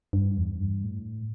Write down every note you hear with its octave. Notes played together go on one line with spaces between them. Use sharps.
G2
E2
G2
A2